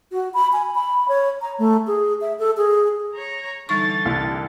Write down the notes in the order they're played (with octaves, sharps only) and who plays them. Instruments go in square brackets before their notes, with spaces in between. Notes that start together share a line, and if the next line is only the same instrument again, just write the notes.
[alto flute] F#4
B5
G#5
B5
C#5
A#5
A3
G#4
E5
A4
G#4
[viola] C#5 A#5
[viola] D3 E3 [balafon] G3 D#4 C#6 [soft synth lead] A6
[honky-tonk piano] C2